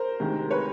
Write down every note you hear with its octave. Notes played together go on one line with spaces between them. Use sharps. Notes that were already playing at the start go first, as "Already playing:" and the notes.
Already playing: A#4 C5
D2 C3 D#3 G#3
B4 C#5